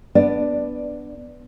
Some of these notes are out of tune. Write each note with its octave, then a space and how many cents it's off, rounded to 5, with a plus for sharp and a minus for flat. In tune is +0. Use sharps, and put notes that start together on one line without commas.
B3 +0 D4 +0 D5 +10